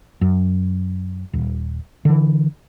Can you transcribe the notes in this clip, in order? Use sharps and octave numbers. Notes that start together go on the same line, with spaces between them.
F#2
D#1
D3 E3